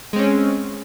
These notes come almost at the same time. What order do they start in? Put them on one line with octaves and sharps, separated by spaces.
G#3 C4 C#4